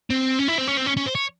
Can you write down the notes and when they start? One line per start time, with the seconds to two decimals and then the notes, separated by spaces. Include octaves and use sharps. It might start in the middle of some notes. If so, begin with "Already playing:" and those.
0.10 C4
0.39 C#4
0.48 E4
0.58 C4
0.68 C#4
0.77 C4
0.86 C#4
0.97 C#4
1.06 C5
1.15 C#5